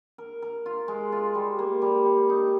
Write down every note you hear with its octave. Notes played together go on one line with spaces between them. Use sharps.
A#4
A#4
F4
G#3
F4
G3
A#3
G3
G3
D#4